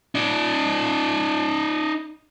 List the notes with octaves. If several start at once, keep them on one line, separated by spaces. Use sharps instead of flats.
D#4 D5